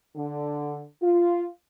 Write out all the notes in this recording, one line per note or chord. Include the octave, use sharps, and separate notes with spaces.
D3
F4